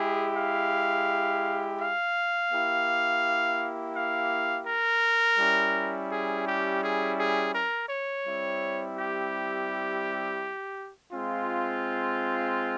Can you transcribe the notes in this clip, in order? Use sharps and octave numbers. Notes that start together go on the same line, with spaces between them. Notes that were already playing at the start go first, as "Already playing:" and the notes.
Already playing: G#3 E4 G4 G#4
F5
F5
A#3 E4 G4
F5
A#4
G3 C#4 E4
G#4
G4
G#4
G#4
A#4
C#5
G3 C4 E4
G4
G#3 C4 F4